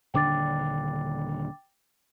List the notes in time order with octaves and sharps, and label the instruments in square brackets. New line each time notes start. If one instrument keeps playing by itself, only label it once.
[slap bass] D#1 D3 D4 [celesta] G5 D6 A6